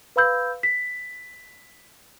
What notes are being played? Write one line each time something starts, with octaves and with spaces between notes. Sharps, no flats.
B4 F5 B5 E6 G6
B6